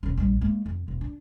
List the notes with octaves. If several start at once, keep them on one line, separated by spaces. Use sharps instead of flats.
E1 C#4
A#1 G3
G#3 A#3
F2
E1
D4